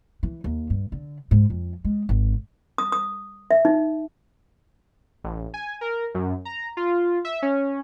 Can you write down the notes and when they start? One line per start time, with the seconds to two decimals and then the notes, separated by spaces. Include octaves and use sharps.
0.23 E3
0.44 D#2
0.70 G2
0.92 D3
1.31 G#2
1.50 F2
1.85 G#3
2.09 G#1
2.78 D#6
2.92 D#6
3.51 E5
3.65 D#4
5.24 A1
5.54 G#5
5.81 A#4
6.15 F#2
6.45 A#5
6.77 F4
7.25 E5
7.42 C#4